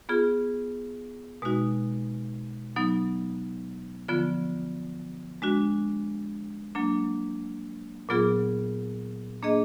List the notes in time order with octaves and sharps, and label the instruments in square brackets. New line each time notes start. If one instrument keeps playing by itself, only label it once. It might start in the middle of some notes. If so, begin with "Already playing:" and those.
[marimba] B3 F4 G#4
B2 G#3 D#4 F#4
F#3 B3 D#4
D3 F3 B3 F4
G#3 D4 F#4
F#3 A#3 D4
A#2 F#3 B3 F4 G#4
A#3 D4 G#4 D#5